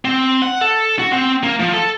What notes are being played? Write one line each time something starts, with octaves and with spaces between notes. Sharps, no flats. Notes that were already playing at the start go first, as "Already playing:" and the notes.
C4
F#5
A4
F#4
C4
A#3
F3
A4